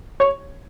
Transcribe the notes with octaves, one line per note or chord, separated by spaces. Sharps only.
C#5